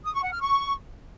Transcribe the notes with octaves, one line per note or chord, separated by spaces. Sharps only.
D#6
C#6
F#5
F6
C#6